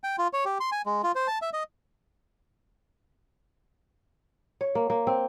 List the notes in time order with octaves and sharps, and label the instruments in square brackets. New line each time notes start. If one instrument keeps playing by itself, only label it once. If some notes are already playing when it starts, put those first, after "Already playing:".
[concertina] G5
F4
C#5
G4
C6
G#5
G#3
F4
C5
A5
E5
D#5
[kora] C#5
A#3
A#3
C4